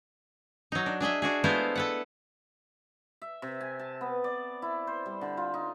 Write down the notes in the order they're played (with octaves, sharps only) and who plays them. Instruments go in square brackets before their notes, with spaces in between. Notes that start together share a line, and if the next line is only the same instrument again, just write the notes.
[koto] F#3 D#4
D4
D4 G#4 D#5 E5
D4 F#4 G#4
G#3 A3 B3 E4 F4 C5
A4 B4 F#5
[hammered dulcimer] E5
C3
G#5
A5
B3
D5
E4
C5
G3
D3
F4
D#4